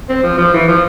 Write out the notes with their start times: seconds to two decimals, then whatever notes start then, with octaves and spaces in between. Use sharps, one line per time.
0.09 C4
0.23 F3
0.38 F3
0.54 E3
0.68 F3